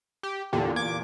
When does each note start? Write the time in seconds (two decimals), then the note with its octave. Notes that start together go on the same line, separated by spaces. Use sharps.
0.23 G4
0.53 E2 A#2 D3 G4
0.76 D6 G#6